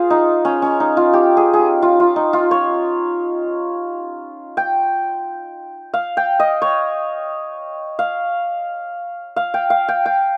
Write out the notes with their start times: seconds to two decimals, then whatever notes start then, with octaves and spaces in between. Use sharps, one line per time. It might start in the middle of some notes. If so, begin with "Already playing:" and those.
Already playing: F4 G#4 C5
0.10 D#4
0.45 C#4
0.62 C#4
0.80 D#4
0.97 F4
1.13 G4
1.37 G#4
1.53 G#4
1.59 G4
1.82 F4
2.00 F4
2.16 D#4
2.33 F4
2.51 C#5
4.57 G5
5.94 F5
6.17 G5
6.40 D#5
6.62 C#5
7.99 F5
9.36 F5
9.54 G5
9.70 F5
9.88 G5
10.06 G5